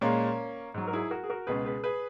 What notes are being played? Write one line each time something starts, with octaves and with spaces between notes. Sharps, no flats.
A#2 G#3 A#3 C#4
G#2 F#3
A#4
E4 G#4
F#4 A#4
G#4
F#4 A#4
C#2 B2 G#3 G#4 B4
G#4 B4
G#4 B4